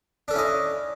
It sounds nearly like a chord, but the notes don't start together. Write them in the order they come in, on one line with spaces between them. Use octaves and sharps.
D4 A4 C#4 E4 D#5